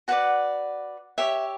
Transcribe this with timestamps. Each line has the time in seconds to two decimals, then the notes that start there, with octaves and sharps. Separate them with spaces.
0.08 F#4 B4 D5 F#5
1.18 G4 C#5 E5